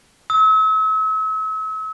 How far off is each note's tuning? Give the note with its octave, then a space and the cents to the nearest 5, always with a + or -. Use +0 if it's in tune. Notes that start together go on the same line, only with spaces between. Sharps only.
E6 -40